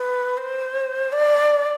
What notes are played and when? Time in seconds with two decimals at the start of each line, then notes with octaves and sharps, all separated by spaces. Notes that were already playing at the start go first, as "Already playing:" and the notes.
Already playing: B4
0.37 C5
1.12 D5